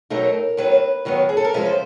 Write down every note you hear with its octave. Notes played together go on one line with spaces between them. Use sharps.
B2 F#3 A3 C4 D#4 A#4
D#2 D#3 F#3 B3 B4
D#2 D#3 F#3 B3
G#4
A4
A#4
F2 C3 F3 G#3 C#4 B4
C5